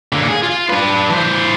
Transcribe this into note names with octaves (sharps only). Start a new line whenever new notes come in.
D3 A#3
G#4
F4
D4 B4
E3 C5